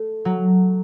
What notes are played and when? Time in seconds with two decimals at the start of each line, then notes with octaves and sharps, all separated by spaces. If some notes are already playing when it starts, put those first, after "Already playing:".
Already playing: A3
0.25 F#3